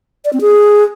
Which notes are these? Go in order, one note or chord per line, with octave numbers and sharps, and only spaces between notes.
D5
C4
G#4